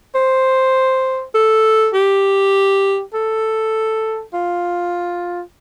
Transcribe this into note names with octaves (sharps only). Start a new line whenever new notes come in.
C5
A4
G4
A4
F4